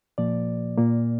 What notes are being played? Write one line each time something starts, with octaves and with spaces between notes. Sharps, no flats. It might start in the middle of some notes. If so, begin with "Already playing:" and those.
A#2 F3 A#3 D5
A#2 A#3